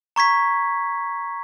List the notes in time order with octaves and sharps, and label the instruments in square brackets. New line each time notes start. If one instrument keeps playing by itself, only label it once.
[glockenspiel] A#5 C#6 G#6 B6